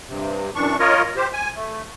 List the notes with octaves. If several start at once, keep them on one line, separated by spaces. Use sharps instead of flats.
G2 C3
F#2 E3 D4 C#6
F4 A#4 C#5 D#5
G4 C5
G#5
A3